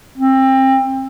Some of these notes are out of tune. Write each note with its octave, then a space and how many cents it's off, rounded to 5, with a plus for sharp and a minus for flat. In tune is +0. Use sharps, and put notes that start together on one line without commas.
C4 +25